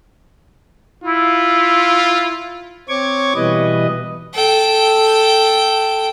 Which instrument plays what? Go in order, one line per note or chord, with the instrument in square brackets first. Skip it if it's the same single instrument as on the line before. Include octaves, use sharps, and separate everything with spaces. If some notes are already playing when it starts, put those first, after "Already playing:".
[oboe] E4 [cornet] F4
[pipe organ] C4 C#5 C#6 D6 G#6
B2 E3 G3 B4 D#5
[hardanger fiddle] A4 G5